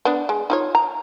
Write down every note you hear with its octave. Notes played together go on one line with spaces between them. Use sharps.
B3 D4
G#3
D#4 F4 C#5
A#5